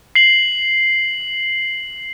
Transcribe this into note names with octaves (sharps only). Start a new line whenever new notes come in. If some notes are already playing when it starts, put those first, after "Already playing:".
C7 F#7